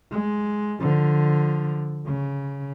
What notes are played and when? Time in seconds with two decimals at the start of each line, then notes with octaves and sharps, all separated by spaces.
0.12 G#3
0.80 D3 F3
2.06 C#3